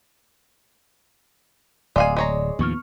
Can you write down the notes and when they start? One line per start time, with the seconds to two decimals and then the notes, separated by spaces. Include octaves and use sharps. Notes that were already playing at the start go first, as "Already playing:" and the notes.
1.96 D1 G#3 D5 F5 G#5
2.17 G#3 C#5 A#5
2.59 D#2 A2 F3 B3 C#6 F6